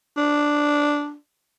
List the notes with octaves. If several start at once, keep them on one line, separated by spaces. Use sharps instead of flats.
D4